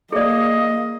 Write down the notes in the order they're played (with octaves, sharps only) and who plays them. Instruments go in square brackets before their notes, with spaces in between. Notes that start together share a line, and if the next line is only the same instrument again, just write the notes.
[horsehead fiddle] A#3 [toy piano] G#4 D5 [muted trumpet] D#5